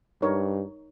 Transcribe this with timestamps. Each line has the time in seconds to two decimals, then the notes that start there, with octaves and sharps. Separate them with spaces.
0.22 G2 D#4 A#4 C#5